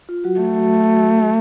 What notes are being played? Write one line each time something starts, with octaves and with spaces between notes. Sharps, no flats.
F4
F#3 F#4
A3